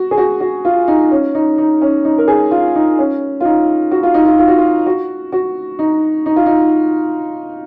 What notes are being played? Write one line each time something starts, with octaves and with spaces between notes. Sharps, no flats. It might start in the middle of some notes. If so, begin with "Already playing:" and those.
Already playing: F#4
G#4
F#4
F#4
F4
D#4
C#4
D#4
D#4
C#4
D#4
A#4
G#4
F4
D#4
C#4
F4
D#4
F#4
F4
D#4
F4
F4
F#4
F4
F#4
F#4
D#4
D#4
F4
D#4